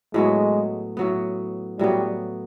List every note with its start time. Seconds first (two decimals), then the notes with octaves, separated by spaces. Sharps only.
0.14 A2 F#3 G#3 B3
0.97 A2 F#3 B3
1.79 A2 F#3 G3 B3